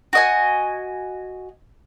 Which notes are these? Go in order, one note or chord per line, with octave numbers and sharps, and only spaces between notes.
F#4 D#5 G#5